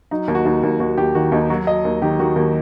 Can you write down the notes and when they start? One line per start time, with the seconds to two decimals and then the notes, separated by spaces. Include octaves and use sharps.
0.11 F#3 D#4
0.28 D#2
0.35 F#4
0.45 D#2 D#4
0.63 D#2
0.80 D#2 F#4
0.97 D#2 G4
1.15 D#3 F#4
1.32 D#2 D#4
1.50 F#3 F#4
1.67 F#3 D#5
1.85 D#2
2.02 D#3 G4
2.19 D#3 F#4
2.36 D#2